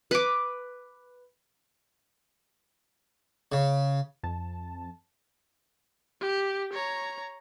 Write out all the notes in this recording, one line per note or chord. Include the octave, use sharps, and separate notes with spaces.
B4 D6
C#3
F2 A5
G4
C#5 A#5